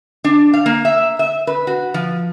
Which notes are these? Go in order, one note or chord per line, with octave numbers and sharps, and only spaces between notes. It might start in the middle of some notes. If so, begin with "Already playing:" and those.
D4
F5
A#3
E5
E5
B4
F#4
F3